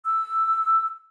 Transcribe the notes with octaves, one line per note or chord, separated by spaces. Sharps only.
E6